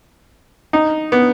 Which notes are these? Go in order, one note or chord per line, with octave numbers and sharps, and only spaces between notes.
D#4
B3